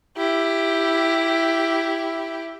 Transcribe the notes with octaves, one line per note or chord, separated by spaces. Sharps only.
E4 G4